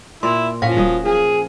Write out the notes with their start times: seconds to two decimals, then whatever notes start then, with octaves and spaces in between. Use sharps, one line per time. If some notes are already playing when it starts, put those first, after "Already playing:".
0.23 A#2 E4 D5 C6
0.62 A2 F3 C#4 F5 F#5 G#5
0.77 D#1 F#3 D#5
1.05 F3 G#4